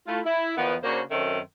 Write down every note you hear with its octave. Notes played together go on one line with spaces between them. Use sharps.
A3 E4 F4
E4
E2 D#3 F3 B3
C#3 A#3 D4 F#4 C5
F#2 D#3 C4 C#4 A4 E5